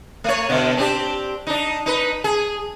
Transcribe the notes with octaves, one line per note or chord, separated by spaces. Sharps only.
A3 C#5
B2 D3
C4 D4 G4
D4 D#4
D#4 B4
G#4